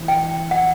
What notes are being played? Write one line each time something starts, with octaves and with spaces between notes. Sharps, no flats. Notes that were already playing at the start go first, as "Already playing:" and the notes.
Already playing: E3 A3 C4 E4
G5
F#5